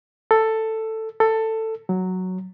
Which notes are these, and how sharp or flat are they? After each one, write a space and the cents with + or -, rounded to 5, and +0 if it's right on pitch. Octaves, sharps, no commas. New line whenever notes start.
A4 +10
A4 +15
F#3 +0